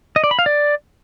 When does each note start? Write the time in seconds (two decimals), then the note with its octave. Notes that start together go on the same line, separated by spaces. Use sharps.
0.16 D#5
0.24 D5
0.31 B5
0.39 F5
0.46 D5